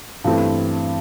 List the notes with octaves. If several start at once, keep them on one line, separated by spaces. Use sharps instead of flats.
G2 E3 A3 C4 E4